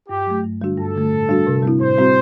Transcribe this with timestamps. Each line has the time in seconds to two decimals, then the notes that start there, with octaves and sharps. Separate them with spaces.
0.09 G2 G4
0.27 F#3 A3
0.44 G2
0.61 D3 G3 D4 F#4
0.77 G2 A4
0.95 D3 A3
1.13 A2
1.29 G3 D4 F#4
1.47 C3
1.63 G3 C4 E4
1.80 A2 C5
1.98 G3 C4 F#4